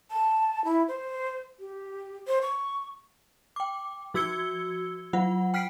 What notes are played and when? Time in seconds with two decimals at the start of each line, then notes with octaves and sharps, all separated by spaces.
0.11 A5
0.65 E4
0.88 C5
1.60 G4
2.27 C5
2.42 C#6
3.56 G5 D6
4.14 F3 F#4 E6 G#6 C#7 G7
5.13 F#3 F4 F#5
5.54 G5 F6 B6 C7 D7